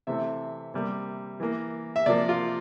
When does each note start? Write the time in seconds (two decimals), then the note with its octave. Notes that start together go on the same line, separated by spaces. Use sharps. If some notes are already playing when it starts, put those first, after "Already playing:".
0.07 C3 E3 A3 C4 E5
0.74 C3 G3 A#3
1.40 E3 A#3
1.96 E5
2.06 C3 F3 A#3 D5
2.29 F4